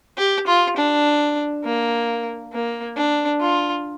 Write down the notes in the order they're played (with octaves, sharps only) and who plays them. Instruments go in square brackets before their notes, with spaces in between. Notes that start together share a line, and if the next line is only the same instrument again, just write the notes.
[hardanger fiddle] G4
F4
D4
A#3
A#3
D4
F4